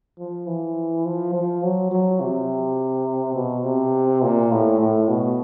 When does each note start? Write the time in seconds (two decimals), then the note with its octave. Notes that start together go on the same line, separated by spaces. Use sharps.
0.19 F3
0.47 E3
1.05 F3
1.34 F3
1.63 F#3
1.91 F#3
2.20 C3
3.35 B2
3.64 C3
4.22 A#2
4.51 A2
4.80 A2
5.08 B2